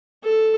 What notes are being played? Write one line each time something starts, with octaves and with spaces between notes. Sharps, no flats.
A4